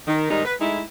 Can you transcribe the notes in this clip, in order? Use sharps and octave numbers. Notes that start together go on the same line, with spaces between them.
D#3
G#2 D#3 G3 G#3 D#4
B4
G#3 A3 D#4 E4